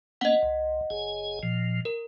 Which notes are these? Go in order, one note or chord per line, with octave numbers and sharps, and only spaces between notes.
A#3 B3 C#4 D#5 F#5
C2
F#1 G#4 G#5
A#2 F3
A#4